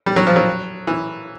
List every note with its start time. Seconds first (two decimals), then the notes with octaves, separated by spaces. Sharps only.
0.06 G3
0.16 F#3
0.27 F3
0.36 F#3
0.87 E3